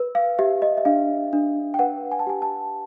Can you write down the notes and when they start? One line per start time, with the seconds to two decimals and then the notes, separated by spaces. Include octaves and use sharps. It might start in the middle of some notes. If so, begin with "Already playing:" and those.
Already playing: B4
0.15 F5
0.39 G4 E5
0.62 D#5
0.77 E5
0.85 D4 F5
1.33 D4
1.74 G5
1.79 B4 F#5
2.11 G#5
2.19 A5
2.27 G4 G#5
2.42 A5